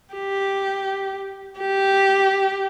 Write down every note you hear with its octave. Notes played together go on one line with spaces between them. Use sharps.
G4
G4